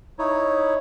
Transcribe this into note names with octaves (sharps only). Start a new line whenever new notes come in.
D#4 E4 C#5